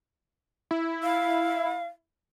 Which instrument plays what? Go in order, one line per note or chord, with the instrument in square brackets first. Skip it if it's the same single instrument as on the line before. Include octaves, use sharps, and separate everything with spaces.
[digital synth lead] E4
[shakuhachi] F5